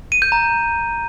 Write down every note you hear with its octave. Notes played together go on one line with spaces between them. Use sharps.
D#7
G6
A#5